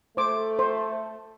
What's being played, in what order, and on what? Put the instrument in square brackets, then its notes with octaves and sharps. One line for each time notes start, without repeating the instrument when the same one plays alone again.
[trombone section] A3 [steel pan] C5 D6
[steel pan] C5